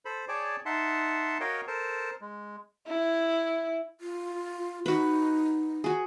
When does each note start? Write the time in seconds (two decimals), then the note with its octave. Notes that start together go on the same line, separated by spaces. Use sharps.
0.05 A4 C5 B5
0.28 G#4 C#5 D5 G5 A5 D6
0.66 D#4 E5 F#5 A5 C6
1.40 F#4 A#4 C#5 D#5 F5 G5
1.67 A4 A#4 C5 A5
2.21 G#3
2.87 E4
4.01 F4
4.86 D#4 F#4 B4
5.84 F#4 G#4